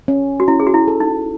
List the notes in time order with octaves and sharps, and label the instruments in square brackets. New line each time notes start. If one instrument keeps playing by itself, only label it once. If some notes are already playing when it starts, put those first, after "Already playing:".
[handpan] C#4
[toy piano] F#4
[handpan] C#4 [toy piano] E4
[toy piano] G#4
F#4
E4
[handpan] A4
[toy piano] D#4